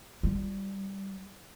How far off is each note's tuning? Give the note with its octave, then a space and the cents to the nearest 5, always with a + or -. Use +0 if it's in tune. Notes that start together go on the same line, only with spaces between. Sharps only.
G3 -5 F4 -10